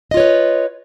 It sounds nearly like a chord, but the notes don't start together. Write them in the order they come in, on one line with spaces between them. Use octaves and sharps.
D#5 F4 C#5 B4